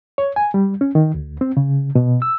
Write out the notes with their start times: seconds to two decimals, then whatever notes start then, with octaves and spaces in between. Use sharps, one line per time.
0.18 C#5
0.36 G#5
0.54 G3
0.81 C#4
0.95 D#3
1.14 D2
1.41 C4
1.57 C#3
1.95 B2
2.22 E6